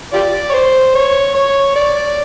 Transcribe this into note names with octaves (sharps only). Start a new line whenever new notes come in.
F4 G4 D5
C#5
C5
C#5
C#5
D5